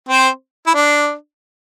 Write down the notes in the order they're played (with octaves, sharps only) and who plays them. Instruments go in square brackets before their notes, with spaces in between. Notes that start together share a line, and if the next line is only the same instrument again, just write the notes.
[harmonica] C4 C5
E4
D4